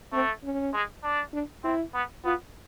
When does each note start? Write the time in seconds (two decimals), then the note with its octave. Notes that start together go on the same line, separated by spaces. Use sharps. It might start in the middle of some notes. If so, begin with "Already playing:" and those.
0.12 A3 C4
0.43 C#4
0.73 G#3
1.04 D4
1.33 D4
1.64 C4 E4
1.93 B3
2.24 B3 F4